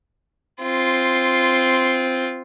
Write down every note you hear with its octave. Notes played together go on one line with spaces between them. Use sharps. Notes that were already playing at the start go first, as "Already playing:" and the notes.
C4 F4